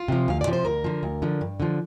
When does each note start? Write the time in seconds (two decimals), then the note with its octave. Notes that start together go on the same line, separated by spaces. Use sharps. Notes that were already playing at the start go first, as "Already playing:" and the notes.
Already playing: F4
0.08 C3 F3
0.28 D2 F5
0.41 D5
0.47 C3 F3
0.53 C5
0.65 D2 A#4
0.84 D3 F3
1.03 D2
1.22 D3 F3
1.41 G2
1.60 D3 F3